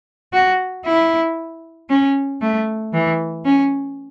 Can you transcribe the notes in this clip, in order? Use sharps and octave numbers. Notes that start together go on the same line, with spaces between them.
F#4
E4
C#4
A3
E3
C#4